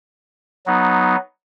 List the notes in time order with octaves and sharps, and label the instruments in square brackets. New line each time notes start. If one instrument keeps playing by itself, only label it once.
[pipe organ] F#3 B3 D#4